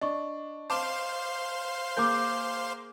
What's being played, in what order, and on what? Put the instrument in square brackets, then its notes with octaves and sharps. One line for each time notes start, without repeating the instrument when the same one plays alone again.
[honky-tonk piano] D4 [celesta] D#5 C#6
[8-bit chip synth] C5 F5 C6 [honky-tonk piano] A5 D6 E7
[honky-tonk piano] A#3 G#4 A#4 [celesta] D6 G6